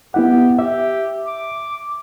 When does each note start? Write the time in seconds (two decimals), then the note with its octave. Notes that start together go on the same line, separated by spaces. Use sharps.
0.14 B3 E4 G4 F#5
0.59 G4 E5
1.27 D6